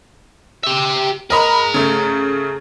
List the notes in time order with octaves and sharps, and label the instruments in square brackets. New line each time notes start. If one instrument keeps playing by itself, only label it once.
[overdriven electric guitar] G4 E5
[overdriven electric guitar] G#4 A#5 [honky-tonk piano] A#4 D#5 B5
[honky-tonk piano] C#3 A3